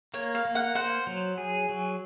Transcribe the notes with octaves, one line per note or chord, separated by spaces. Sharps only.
A#3 C#5
F5
A#3
F#5
C5 F#5
F#3
G#4
F#3